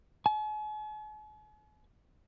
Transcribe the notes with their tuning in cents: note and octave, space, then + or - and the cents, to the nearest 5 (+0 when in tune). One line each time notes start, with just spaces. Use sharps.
G#5 +45